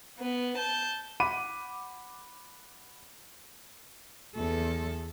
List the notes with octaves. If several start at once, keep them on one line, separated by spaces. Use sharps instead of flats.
B3
A5 G6
F#5 B5 D6 D#7
E2 A4